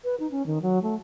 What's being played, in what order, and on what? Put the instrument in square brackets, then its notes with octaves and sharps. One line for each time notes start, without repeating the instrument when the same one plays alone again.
[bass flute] B4
D#4
C#4
D#3
F#3
A3